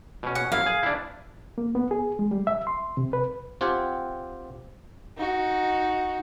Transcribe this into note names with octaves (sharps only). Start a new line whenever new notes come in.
B2 C#4
F#5
F#2 E4 F5
G#4
D4 E4
A#3
B3
G#4
G#3
G3
E5
C6
C3
B4
C4 F4 G4 F#5 G#5
D#4 F#4